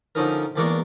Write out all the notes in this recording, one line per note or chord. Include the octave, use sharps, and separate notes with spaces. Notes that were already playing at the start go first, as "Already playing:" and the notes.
D3 F3 C#4 D#4 A#4
E2 G#3 A#3 D4 A#4 C#6